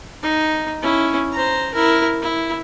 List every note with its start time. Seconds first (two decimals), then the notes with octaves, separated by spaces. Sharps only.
0.23 D#4
0.82 C#4 E4
1.33 C5 A#5
1.74 E4 A#4
2.22 E4